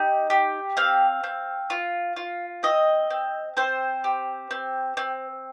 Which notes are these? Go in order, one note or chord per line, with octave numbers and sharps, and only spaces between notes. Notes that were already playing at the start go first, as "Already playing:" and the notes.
Already playing: D#4 G4
G4
C4 F5
C4
F4
F4
C4 D#5
C4
C4 C5
G4
C4
C4